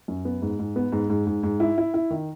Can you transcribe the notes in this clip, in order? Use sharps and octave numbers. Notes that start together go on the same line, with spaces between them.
F#2
B3
G#2
G#2
B3
G#2
G#2
G#2
G#2
E4
E4
E4
D#3